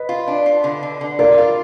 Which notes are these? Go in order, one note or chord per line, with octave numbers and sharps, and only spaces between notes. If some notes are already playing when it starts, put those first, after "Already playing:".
Already playing: B4 D#5
F4
D4
F4
D3
D3
D3
F4 A#4 D5
F4